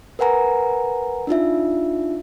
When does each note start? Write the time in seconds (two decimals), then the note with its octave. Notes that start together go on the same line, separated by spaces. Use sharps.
0.19 A#4 B4 F#5 G#5 A#5
1.27 D4 D#4 F4 E5